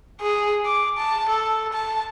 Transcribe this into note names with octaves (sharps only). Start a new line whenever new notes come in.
G#4
D6
A5
A4
A5